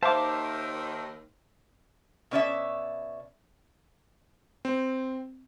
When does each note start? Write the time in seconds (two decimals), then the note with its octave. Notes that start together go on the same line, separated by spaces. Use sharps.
0.03 D#2 D#3 C5 E5 F5 A5 D6
2.31 B2 C#4 D5 E5
4.65 C4